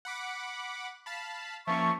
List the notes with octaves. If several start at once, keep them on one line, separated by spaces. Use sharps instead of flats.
F#5 B5 D6
F5 A5 B5
F3 A#3 C#4 E5 A5 C#6